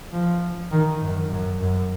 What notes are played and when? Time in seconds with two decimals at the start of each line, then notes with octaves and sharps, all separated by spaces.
0.12 F3
0.72 D#3
1.01 F#2
1.31 F#2
1.60 F#2